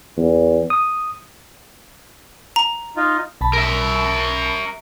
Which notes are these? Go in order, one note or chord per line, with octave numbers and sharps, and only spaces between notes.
E2
D#6
A#5
D#4 F4
B1 A5 B5
A#4 E5